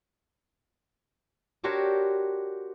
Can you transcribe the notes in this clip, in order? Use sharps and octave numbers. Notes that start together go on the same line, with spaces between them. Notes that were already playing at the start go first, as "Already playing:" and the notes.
D4 F#4 G4 A#4 C5 C#5